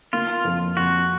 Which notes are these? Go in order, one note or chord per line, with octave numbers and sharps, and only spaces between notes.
A#3 F4
F2
F2 F#4